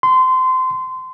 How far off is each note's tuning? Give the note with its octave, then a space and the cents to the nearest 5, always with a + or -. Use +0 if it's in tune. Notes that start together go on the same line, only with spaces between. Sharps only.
C6 -25